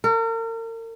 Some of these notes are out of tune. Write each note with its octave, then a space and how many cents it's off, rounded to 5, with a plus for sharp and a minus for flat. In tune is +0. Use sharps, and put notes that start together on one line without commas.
A#4 -40